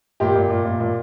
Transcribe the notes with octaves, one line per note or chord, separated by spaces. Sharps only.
A#2 G4
A#2
A#2
A#2
A#2